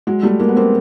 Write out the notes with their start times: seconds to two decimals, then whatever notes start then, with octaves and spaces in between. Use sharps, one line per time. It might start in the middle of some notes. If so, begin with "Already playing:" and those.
0.07 F#3 G#3
0.23 G3 A3
0.39 G#3 A#3
0.49 B3
0.56 A#3 C4